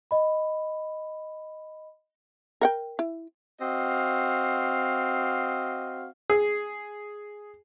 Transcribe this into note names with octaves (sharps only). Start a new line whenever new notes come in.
D#5 B5
A#4 F#5 G5
E4
C4 F#4 D#5 F5
G#4